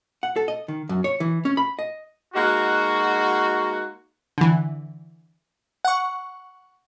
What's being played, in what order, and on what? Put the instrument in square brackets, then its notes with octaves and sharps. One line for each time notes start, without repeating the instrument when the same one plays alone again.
[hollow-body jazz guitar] F#5
A4
D#5
D#3
F#2
C#5
E3
C#4
B5
D#5
[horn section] G#3 A#3 D#4 F#4
[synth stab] D3 E3
F#5 C#6